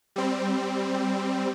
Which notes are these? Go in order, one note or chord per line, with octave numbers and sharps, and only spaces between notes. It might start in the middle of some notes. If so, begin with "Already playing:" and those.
G3 C4